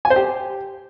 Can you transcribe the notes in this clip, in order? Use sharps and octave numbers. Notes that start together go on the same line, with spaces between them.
G#5
C5
G4